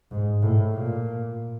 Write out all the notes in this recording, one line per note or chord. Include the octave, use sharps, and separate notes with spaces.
G#2
A2
A#2